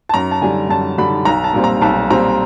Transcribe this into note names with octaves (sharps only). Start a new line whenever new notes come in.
A5
F#2 A#5
A5
D3 G3 G#5
F#2 A5
D3 G3 B5
B1 A#5
A5
A#2 G3 C4
A#5
B1 A5
A#2 G3 C4 A#5